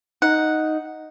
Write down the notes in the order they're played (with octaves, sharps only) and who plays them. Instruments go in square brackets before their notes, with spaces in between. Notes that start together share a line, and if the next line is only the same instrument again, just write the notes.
[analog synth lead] D#4 [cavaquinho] F#5